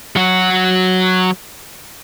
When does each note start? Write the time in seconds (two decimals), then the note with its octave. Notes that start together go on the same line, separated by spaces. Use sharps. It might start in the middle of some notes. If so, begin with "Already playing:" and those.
0.16 F#3 F#4